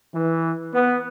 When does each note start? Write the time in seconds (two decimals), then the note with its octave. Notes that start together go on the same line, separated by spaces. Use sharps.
0.13 E3
0.74 B3